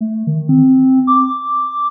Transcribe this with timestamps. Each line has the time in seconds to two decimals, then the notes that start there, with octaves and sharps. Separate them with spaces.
0.01 A3
0.27 D#3
0.49 C4
1.07 D6